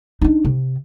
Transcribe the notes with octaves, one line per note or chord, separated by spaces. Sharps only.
D4 D#4
C3